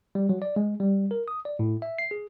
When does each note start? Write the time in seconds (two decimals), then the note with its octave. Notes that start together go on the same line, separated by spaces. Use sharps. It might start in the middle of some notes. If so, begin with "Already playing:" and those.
0.15 G3
0.29 F#3
0.42 D5
0.56 G#3
0.80 G3
1.11 A#4
1.28 D#6
1.45 D5
1.59 A2
1.82 E5
1.99 C7
2.11 G#4